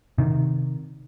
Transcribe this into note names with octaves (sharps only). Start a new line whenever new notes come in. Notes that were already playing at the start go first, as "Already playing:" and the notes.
C3 D#3